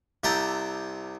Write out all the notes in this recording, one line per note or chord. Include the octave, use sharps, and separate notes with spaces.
C2 C3 E5 G5 A5 A#5